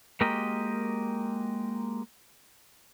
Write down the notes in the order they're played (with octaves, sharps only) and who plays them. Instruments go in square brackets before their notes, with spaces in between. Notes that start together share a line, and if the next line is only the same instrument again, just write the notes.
[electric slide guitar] G#3 A#3 F#4 G4 A#4 D#5